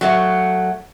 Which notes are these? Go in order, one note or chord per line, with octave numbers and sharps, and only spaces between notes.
F#3 A3 F#4